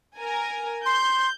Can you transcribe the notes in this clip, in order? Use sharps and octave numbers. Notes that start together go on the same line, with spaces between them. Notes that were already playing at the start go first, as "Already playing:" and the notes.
A#4 G#5
C6 G6